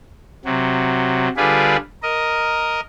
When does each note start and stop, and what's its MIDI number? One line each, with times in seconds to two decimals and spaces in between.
0.45 1.29 48
0.45 1.29 54
1.37 1.77 50
1.37 1.77 55
1.37 1.77 65
1.37 1.77 68
1.37 1.77 71
1.37 1.77 74
2.03 2.80 70
2.03 2.80 75